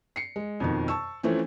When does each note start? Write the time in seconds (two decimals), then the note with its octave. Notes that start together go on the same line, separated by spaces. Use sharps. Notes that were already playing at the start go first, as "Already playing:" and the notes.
0.16 C7 C#7
0.36 G#3
0.60 F2 B2 D#3
0.88 A5 C#6 E6
1.23 E3 F3 A3 C4 C#4